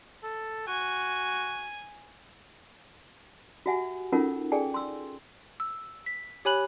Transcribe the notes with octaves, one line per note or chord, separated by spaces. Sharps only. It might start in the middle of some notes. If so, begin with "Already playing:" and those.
A4
F#4 G#5
F#4 G4 E5 F#5 G#5
C#4 D#4 F4 A4 A#4 F#5
G#4 A4 D5 G5 G#5
C6 E6
E6
B6
G4 C#5 G#5 B5 F#6 F#7